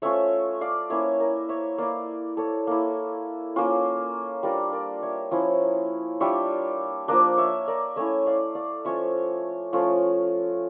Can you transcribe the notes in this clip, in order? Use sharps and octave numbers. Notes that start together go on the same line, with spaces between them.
A3 C#4 F4 C#5 E5
D5 F5
A#3 C#4 E4 C#5 E5
A#4 D5
C#5 E5
A#3 E4 D5 F5
A4 C#5
A#3 E4
A#3 C#4 F4
G3 D4 F4 A#4 D5
A#4 D5
C#5 E5
F3 C#4 E4
G3 D4 F4 C#5 E5
F3 A#3 D4 A#4 D5
C#5 E5
A#4 D5
A3 C#4 E4 C#5 E5
D5 F5
D5 F5
F3 C#4 F4 C#5 E5
F3 A3 C#4 F4